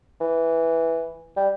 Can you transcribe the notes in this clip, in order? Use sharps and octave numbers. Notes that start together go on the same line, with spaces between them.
E3
G3